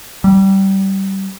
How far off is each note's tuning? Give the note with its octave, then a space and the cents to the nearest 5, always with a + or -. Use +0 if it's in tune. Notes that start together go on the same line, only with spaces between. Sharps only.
G3 -20